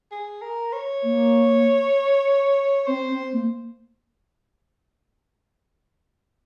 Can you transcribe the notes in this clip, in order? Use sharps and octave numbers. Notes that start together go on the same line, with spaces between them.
G#4
A#4
C#5
A#3
C4 C5
C4
A#3